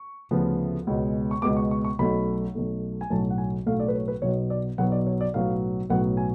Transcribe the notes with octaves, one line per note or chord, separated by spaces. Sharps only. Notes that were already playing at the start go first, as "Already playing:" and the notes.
Already playing: C#6
D2 C#3 F3 B3
C#2 B2 G#3 B3
C#6
C#2 B2 G#3 B3 D6
C#6
C#6
C#6
B1 B2 A3 B5
B1 B2 A3
G#5
B1 A2 F#3 A3 A5
F#5
G#5
B1 A2 F#3 A3 F5
D5
B4
C#5
B4
B1 B2 F#3 B3 C#5
D5
B1 B2 F#3 B3 F#5
D5
C#5
D5
B1 A2 F#3 B3 F5
B1 A2 F#3 B3 F#5
G#5